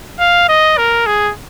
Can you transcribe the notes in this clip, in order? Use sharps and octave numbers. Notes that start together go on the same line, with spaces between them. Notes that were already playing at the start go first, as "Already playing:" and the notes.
F5
D#5
A#4
G#4